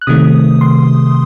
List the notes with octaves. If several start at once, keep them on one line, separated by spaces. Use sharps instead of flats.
F#6
C3 D#3 A3 D#6
C6